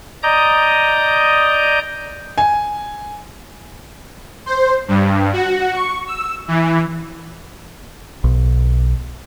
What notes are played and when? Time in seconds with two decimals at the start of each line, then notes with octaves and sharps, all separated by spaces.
0.23 D5 D#5 A#5 D#6 G6
2.38 G#5
4.46 C5
4.88 G2
5.33 F#4
5.73 C#6
6.07 E6
6.48 E3
8.24 B1